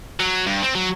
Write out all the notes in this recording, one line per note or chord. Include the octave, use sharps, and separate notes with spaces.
F#3
G2
C4
F#3